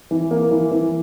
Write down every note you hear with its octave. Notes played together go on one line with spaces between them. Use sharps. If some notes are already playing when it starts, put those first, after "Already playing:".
E3
A#3
E3
E3